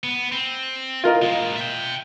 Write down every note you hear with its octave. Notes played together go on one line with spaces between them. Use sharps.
B3
C4
F4 A#4 D#5
A#2 G#3
E5 G5